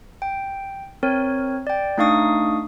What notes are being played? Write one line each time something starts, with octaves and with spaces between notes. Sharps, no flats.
G5
C4 A#4 C#5
D5 G5
A3 D4 D#4 F5 C#6 D#6